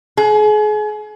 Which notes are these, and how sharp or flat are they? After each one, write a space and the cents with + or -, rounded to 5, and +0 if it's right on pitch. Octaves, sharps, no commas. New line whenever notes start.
G#4 +35